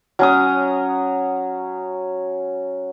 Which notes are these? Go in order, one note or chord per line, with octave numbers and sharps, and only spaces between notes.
F#3 C#4 D#6